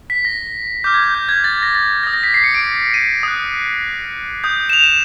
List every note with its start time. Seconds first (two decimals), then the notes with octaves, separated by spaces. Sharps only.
0.10 B6
0.25 A#6
0.84 D6 F6 G6
0.94 G#6
1.04 G6
1.15 G6
1.29 G#6
1.44 A6
1.63 A#6
1.75 A6
2.03 D#6 G6 A#6
2.13 A#6
2.24 B6
2.34 C7
2.44 C#7
2.54 D7
2.94 D#7
3.23 D#6 F#6
4.44 D#6 G6
4.70 E7
4.73 F7
4.84 E7